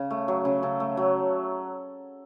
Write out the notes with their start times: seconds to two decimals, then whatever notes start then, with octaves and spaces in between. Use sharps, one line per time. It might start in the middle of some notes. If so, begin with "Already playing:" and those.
Already playing: C#3
0.10 A3
0.28 F#3
0.45 C#3
0.62 C#3 A4
0.80 A3
0.97 F#3